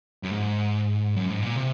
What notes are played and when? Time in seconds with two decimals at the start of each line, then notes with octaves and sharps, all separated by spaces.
0.23 F#2
0.31 G#2
1.16 F#2
1.30 G#2
1.42 A#2
1.56 C3